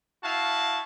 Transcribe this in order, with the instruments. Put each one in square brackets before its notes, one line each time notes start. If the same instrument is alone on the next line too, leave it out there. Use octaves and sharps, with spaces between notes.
[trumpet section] E4 F#4 F5 A5